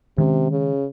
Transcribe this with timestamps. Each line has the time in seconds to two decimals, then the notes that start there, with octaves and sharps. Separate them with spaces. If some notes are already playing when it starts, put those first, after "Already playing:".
0.18 C3 D#3 G#3 C#4
0.51 C#3